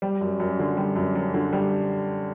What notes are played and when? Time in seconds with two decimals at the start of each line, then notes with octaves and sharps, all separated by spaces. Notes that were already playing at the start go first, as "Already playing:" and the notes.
0.02 G3
0.21 F#2
0.40 F#2
0.59 D3
0.77 G3
0.96 F#2
1.15 F#2
1.34 D3
1.53 G3